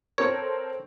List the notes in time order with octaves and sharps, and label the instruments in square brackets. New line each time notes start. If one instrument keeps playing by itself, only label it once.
[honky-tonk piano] C4 A4 A#4 [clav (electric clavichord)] C#5